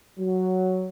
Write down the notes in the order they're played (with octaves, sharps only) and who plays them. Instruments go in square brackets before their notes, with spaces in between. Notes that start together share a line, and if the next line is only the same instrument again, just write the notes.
[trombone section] F#3